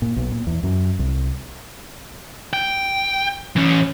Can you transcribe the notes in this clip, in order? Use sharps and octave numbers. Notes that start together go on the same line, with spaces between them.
A#2
B1
A#2
E2
F#2
C2
G5
E3 C#4